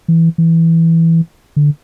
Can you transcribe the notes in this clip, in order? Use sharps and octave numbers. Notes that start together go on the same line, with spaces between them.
E3
E3
D3